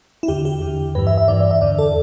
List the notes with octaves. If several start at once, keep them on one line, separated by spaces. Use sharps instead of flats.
E4
E2 D3 G4
G4
E2 D3
G2 E3 B4
E5
E5
G2 E3 D5
D5
E5
E2 D3 D5
A4